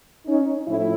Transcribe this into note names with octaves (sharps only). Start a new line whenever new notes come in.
C#4 D#4
A2 F3 E4